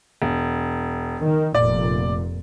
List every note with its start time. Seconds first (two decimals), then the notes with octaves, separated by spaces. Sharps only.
0.22 E1
1.20 D#3
1.55 F1 A#2 D5